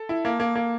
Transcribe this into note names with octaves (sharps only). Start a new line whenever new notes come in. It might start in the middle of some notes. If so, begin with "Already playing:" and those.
Already playing: A4
E4
A#3
A#3
A#3